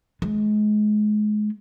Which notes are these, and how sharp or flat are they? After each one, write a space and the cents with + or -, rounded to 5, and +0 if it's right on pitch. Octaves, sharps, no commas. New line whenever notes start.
G#3 +30